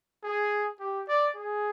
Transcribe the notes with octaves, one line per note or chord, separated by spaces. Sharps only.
G#4
G4
D5
G#4